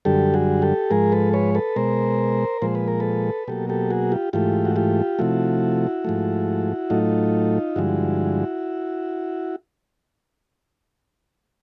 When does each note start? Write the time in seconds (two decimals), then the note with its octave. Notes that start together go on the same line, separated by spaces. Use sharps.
0.05 F#2 D3 G3 G4 A4
0.34 F#4 G#4
0.62 G4 A4
0.90 G#2 F3 G#3 G#4 A#4
1.12 A4 B4
1.34 B4 C#5
1.55 A4 B4
1.76 B2 G#3 A#4 C5
2.62 A#2 F3 G#3 C5
2.75 B4
2.88 A#4
3.00 A4 B4
3.48 B2 F#3 A#3 G4 A4
3.69 G4 A4
3.90 F#4 G#4
4.12 F4 G4
4.33 G#2 E3 A3 F4 G4
4.65 F#4
4.76 F4 G4
5.19 C3 F3 A3 E4 F#4
6.05 G#2 F3 A3
6.90 A2 F#3 A3 D#4 F4
7.76 G2 D3 F3 G#3 E4 F#4